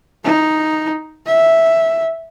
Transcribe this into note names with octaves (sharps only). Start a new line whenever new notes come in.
D#4
E5